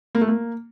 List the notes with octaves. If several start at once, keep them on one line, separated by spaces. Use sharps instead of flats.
A#3
A3
A#3